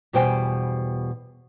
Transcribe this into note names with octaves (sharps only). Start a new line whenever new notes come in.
E2 B2 G3 C5 G5 G#5